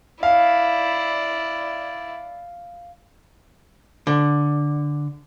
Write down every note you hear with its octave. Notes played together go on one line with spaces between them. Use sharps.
E4 D5 F5
D3